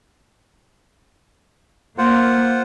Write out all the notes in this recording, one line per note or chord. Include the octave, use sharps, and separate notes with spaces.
A#3 F4 C5 F#5